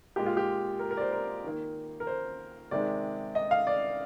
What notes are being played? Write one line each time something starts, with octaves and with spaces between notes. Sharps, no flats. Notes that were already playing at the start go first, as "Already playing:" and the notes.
A#2 G#3 G4
F4
G4
A#4
A#4
D5
C5
A#4
D#3 A#3
A#4
C5
C3 D#3 G#3 D5
D#5
F5
D5